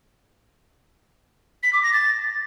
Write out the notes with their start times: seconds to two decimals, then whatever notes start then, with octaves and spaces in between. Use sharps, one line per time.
1.63 B6
1.73 D6
1.83 A#6
1.93 A6